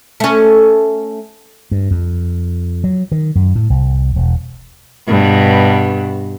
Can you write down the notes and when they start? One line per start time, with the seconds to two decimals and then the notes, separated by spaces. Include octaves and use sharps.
0.20 A3 C#4
1.71 G2
1.91 F2
2.84 F#3
3.12 D#3
3.35 F#2
3.55 A2
3.70 C2
4.16 E1
5.08 G2 B2